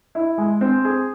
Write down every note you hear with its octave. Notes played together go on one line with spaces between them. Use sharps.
E4
G#3
C4
G#4